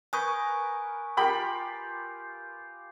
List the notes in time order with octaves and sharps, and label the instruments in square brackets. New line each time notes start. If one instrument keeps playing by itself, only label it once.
[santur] A#4 B4 C#6 [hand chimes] G#5 D#6 G6
[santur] F4 G4 [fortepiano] A#4 G5 B5